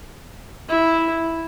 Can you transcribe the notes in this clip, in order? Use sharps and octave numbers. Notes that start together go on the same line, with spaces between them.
E4